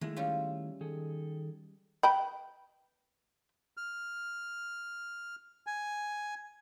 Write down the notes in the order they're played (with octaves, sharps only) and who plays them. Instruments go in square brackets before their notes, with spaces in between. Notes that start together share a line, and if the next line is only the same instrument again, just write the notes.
[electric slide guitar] D#3 A3 E4 [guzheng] G#3
[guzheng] G3 C#4 F4
[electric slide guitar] D#3 G#4 A4
[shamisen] B4 G5 B5
[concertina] F6
G#5